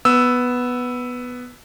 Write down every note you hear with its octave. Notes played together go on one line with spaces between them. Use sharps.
B3 E6